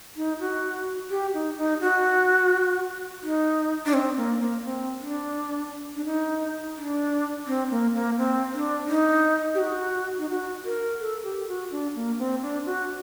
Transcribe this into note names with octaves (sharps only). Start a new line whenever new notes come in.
D#4
F#4
G4
D#4
D#4
F#4
D#4
D4
C4
A#3
A#3
C4
D4
D4
D#4
D4
C4
A#3
A#3
C4
D4
D#4
G4
F#4
D#4
F#4
A#4
A4
G4
F#4
D4
A#3
C4
D4
F#4